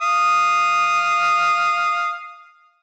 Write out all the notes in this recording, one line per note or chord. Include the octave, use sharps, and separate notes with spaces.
F5 D#6